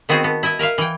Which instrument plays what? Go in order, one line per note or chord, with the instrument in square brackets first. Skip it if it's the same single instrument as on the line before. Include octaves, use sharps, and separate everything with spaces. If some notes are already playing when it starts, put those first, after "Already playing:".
[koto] D#3 B3 C4 F#4 G#4
B3 A5
E4 D#5 E5
A#4 B4 E5 F5
E3 G5